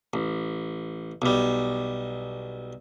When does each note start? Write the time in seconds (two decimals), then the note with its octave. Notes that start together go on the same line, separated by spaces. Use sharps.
0.14 A1
1.22 B1 G3